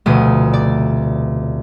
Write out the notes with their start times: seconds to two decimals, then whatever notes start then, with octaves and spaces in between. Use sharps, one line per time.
0.06 F1 D2 B2 A3 D#6
0.53 D5